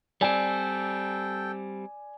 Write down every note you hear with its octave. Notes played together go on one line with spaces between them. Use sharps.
G3 C4 A4 D5 G5 G#5